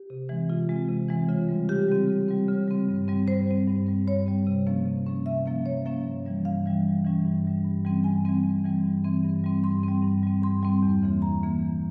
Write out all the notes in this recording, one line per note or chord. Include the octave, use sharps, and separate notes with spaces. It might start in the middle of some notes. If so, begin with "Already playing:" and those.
Already playing: G4
C3
E3 G#3 C4
C3 F4
E3 G#3 C4
C3
E3 G#3 C4
C#3 F4
G3 C4
C#3 G4
G3 C4
C#3
G3 C4
C#3
G3 C4
G2
G3 C4
G2 C5
G3 C4
G2
G3 C4
G2 C#5
G3 C4
C3
F3 A#3 C#4
C3
F3 A#3 C#4
C3 E5
F3 A#3 C#4
C3 C#5
F3 A#3 C#4
G2
E3 G3 C#4
G2 F5
E3 G3 C#4
G2
E3 G3 C#4
G2
E3 G3 C#4
G2
E3 G3 C4
G2 G#5
E3 G3 C4
G2
E3 G3 C4
G2
E3 G3 C4
G2
G3 C4
G2 C6
G3 C4
G2
G3 C4
G2 C6
G3 C4
E2
C#3 E3 A#3
E2 A#5
C#3 E3 A#3
E2